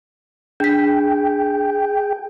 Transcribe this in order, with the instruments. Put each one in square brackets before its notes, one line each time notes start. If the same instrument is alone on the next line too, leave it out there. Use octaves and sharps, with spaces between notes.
[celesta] D4 B6 [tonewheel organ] G#4 G5